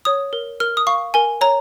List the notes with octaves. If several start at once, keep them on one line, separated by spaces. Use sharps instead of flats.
C#5 D#6
A#4
A#4 F6
D#6
F5 C#6
A#4 G#5
C#5 A#5